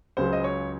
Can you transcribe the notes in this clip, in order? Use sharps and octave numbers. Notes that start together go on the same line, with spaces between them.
C#2 C#3 F#3 C5
D#5
C#5